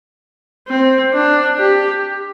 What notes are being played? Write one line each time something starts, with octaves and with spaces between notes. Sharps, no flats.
C4
D4
G4